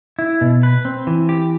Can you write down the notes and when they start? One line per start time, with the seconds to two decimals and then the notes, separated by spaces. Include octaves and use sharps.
0.19 E4
0.41 B2
0.63 B4
0.85 C4
1.07 E3
1.29 G4